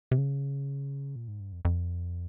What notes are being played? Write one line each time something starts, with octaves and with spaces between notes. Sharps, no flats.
C3
C#3
A#2
G#2
G2
F2
F2